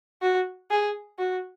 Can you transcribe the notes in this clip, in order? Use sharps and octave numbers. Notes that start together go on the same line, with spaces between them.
F#4
G#4
F#4